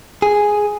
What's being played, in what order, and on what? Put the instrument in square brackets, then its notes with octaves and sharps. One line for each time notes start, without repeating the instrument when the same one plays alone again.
[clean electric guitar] G#4